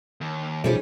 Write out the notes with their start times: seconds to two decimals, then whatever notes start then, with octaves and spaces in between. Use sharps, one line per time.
0.21 D#2
0.64 D2 B2 F3 G3 C#4 D#4 G#4